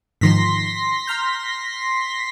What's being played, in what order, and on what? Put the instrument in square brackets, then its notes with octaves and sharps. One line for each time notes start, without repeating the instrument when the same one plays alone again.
[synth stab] G#2 D#3 F3 [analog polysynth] C6 A#6 B6
[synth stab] A#5 F6 G6